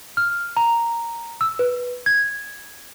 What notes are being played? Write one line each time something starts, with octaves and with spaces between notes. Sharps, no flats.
F6
A#5
E6
B4
G#6